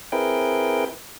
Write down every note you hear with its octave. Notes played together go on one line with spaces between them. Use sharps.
C4 E4 G#4 A#4 B4 G5